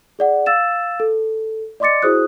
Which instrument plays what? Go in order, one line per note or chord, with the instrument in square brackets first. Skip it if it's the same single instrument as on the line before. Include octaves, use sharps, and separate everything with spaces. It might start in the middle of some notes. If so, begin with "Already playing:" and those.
[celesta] G#4 D5 F#5
F5 E6 A6 E7
A4
D5 D#5 C6 D6 A6 C#7
E4 F#4 G#4 C5 D#6 F#6